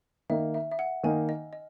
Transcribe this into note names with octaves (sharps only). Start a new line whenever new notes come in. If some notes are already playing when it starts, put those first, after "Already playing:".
D#3 A#3 D#4 E5
E5
E5
F#5
D#3 A#3 D#4 G#5
D#5
D#5